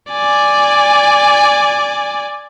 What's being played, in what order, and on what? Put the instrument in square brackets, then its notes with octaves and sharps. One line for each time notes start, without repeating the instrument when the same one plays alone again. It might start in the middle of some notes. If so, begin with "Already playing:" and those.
[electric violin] D5 G#5